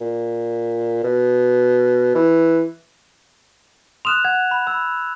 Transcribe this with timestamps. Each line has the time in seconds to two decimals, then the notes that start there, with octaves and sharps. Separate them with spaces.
0.01 A#2
1.04 B2
2.15 E3
4.05 C6 D#6 F6 F#6 E7 F7
4.25 F#5 G#6
4.51 B5
4.67 B5 E6